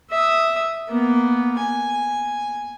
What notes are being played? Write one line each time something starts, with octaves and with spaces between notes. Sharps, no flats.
E5 D#6
A#3 B3
G#5